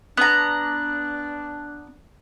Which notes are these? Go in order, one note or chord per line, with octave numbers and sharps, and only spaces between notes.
B3 D4 A#5 F#6